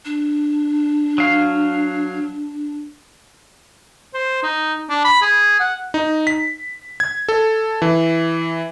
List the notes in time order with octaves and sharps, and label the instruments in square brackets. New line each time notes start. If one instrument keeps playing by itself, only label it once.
[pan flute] D4
[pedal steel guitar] F#3 F5
[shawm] C5
D#4
D4
B5
G#4
F#5
[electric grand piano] D#4
B6
G#6
A4
E3